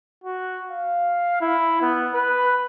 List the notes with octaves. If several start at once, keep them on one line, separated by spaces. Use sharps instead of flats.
F#4
F5
E4
B3
B4